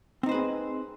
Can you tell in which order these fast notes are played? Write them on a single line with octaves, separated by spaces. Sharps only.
C4 D#4 C5 B4 G#4